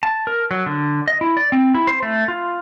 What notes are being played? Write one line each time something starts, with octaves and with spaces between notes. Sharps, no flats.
A5
A#4
F#3
D3
D#5
E4
D5
C4
E4
C5
A3
F4